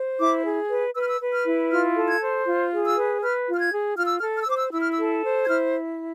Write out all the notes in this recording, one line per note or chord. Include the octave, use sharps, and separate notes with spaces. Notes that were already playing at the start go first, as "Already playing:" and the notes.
Already playing: C5
E4 D6
G#4
B4
B4 E6
F6
E6
B4
F6
E4
F4 F6
A4
G#6
C5
F4
G#4
E6
B4
B4 F6
F4
F6
G#6
G#4
F4 F6
E6
F6
A4
F6
E6
C5 D6
E6
E4 E6
F6
E6
A4
C5
G#6
E4 F6